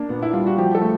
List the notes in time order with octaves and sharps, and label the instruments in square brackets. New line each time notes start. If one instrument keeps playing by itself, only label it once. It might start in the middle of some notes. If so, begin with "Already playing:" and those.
Already playing: [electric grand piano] A#3 D4
[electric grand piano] A#2 [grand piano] B3
[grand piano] E4
[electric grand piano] G3 [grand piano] F4
[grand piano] F#4
[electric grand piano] F3 [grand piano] G4
[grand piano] A4
[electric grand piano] A3